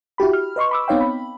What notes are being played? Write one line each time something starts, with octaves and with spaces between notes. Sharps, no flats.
E4 F#4 G4 B5
F6
B4 D#5 C6 C#6
B5 D6 E6
B3 C4 D#4 C#5 F5 G5
B5